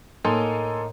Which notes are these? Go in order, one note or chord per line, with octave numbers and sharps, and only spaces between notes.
A2 A#3 D#4 A4 G#5 C6